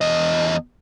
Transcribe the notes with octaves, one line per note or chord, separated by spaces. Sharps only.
E2 D#5